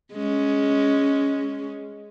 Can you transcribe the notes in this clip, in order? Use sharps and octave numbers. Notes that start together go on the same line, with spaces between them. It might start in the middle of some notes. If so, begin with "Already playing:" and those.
G#3 C#4